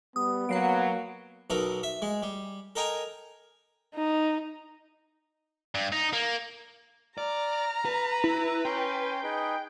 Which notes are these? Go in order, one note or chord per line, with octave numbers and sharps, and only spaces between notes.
G3 B3 D#6
F#3 A#3 F#5 C7 D7
B1 B2 A4 A#4
E5
G#3
G3
A4 A#4 D#5 G5 G#5 A#5
D#4
G2
D#4
A#3
D5 A#5 F6
B4
E4
C#4 G5 C6
D#4 G#4 B4